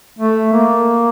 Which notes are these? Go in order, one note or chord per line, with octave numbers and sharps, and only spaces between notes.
A3
A#3